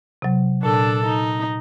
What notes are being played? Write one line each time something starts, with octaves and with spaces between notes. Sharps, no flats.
C3 F#3
A#2 D4 A4
D#4